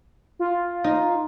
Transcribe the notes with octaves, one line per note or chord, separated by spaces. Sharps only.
F4
D#4